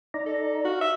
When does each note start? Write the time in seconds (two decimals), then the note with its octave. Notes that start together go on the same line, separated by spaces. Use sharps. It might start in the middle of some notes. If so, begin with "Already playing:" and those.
0.14 D#4 D5 A#5
0.26 A4
0.65 F#4 F5
0.81 E5